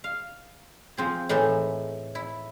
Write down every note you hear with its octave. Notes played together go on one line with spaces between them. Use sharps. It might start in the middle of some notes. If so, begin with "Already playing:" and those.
F5
F3 C4 G#4
A2 E3 D#4 G#4 A4
E4